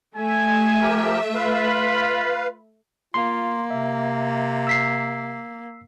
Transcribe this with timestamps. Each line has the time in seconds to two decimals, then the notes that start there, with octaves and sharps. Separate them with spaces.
0.16 A3 E5 G#5
0.81 F3 G4 A#4
1.35 F4 B4 F5 B5
3.14 A#3 F4 C6
3.71 C3 E5
4.67 E6 B6 C7